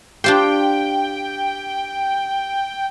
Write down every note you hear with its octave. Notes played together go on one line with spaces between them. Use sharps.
D4 F4 G4 C5 G5